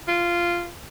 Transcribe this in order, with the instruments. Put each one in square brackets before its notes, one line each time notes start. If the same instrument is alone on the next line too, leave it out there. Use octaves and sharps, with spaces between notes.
[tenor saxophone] F4